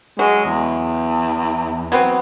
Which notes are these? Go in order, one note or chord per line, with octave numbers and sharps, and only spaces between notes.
F#3 G#3
E2
F#3 B3 C4